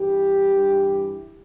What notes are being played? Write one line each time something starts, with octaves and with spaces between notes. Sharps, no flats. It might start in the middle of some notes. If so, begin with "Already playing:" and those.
Already playing: G2 E3 G4
G2 E3